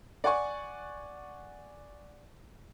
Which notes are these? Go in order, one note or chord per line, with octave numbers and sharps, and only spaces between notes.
D5 F#5 G#5 C#6